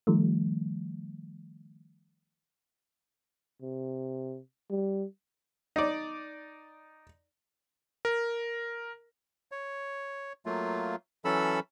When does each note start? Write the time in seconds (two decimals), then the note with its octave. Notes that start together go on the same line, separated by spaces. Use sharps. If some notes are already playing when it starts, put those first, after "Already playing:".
0.07 D#3 F3 G3 A3
3.62 C3
4.70 G3
5.76 D#4 D5
8.05 A#4
9.52 C#5
10.46 F#3 A3 A#3 F4
11.25 E3 F#3 C#4 A4 B5 E6